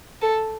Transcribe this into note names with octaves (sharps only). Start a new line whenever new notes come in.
A4